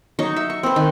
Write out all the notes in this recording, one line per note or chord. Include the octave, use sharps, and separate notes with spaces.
F#3 D#4 C#6
E5
C#6
C4 B4
D#3